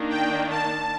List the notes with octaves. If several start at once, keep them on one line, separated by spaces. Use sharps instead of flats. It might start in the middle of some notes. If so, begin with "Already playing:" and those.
Already playing: D#3 A#3 D4
G5
A5